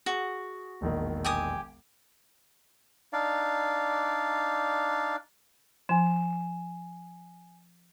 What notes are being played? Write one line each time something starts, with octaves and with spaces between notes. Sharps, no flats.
F#4 G#4
E1 A#1 D#3
G4 G#5 D#6
D4 D#4 D5 F5
F3 G#5 E7